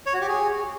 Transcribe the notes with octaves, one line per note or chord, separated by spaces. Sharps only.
C#5
F#4
G4
G#4